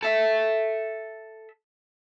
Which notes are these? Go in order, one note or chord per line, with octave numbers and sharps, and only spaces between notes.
A4 E5